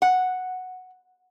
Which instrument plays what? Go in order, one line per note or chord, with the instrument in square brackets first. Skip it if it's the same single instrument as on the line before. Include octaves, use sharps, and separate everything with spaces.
[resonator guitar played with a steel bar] F#5